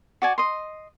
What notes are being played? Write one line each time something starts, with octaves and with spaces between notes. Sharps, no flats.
F#4 D5 G#5
D#5 C6